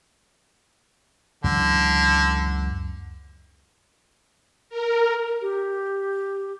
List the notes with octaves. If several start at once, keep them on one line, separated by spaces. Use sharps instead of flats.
C#2 F#2 D3 E3
A#4
G4